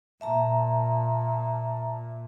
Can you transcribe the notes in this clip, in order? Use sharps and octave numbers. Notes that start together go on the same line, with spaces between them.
A#2 E5 A5 A#5